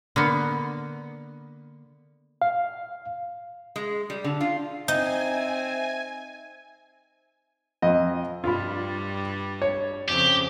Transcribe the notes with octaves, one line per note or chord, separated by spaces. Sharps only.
D3 A#3 B3
F5
G#3
G3
D3
F4
C4 D#4 E5 G#5
F2 D#5
G2 G3 F4 B5
C#5
F2 C#3 G4